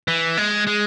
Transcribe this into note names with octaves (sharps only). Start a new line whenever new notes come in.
E3
G#3
G#3